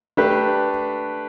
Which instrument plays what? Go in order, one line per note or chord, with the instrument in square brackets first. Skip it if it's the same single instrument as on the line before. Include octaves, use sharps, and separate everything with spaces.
[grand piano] A3 D4 G4 B4